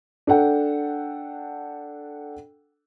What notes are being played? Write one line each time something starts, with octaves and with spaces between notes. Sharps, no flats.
D4 A4 F#5 G5